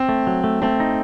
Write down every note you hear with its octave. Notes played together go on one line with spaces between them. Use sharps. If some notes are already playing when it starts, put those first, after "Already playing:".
Already playing: C4
A3
F#3
A3
A3 C4
D#4